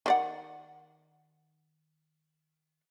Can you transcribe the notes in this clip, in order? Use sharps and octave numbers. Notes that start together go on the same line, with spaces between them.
D#3 D5 F#5